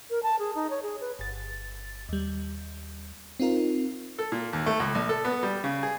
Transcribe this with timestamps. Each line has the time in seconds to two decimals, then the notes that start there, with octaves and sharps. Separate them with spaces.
0.10 A#4
0.23 A5
0.39 G#4
0.55 D#4
0.70 C#5
0.83 G#4
1.01 B4
1.19 G1 A6
2.09 D#2 G3
3.40 C4 D#4 F4 A#4
4.19 A4
4.32 A#2
4.53 D#2
4.66 A3
4.80 C#2
4.95 A#1
5.09 A4
5.25 B3
5.43 G3
5.64 C#3
5.83 G#4